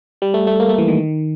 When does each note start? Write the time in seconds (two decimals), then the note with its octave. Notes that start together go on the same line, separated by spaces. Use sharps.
0.22 G3
0.34 A3
0.47 A3
0.60 A#3
0.69 A3
0.78 E3
0.88 D#3